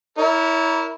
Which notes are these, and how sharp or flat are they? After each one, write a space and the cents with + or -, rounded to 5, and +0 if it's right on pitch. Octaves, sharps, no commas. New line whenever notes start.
E4 -15 A#4 +0 C#5 +30